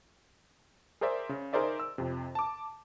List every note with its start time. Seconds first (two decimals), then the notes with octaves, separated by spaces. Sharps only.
1.01 G#4 A#4 C5 D5 E5
1.29 C#3
1.53 D#4 G#4 A#4 C5 D5 E5
1.80 E6
1.98 F2 C3
2.35 A5 D6